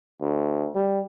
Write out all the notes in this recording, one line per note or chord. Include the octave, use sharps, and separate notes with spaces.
D2
G3